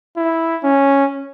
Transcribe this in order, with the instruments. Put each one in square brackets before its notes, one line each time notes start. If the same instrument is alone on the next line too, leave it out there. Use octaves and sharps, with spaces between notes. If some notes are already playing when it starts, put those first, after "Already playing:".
[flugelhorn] E4
C#4